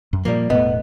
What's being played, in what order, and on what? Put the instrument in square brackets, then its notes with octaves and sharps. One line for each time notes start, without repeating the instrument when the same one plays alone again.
[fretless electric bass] F#2
[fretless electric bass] A#2 F3 [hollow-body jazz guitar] G3 A#3
[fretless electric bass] E1 A2 A3 [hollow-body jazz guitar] B3 [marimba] D#5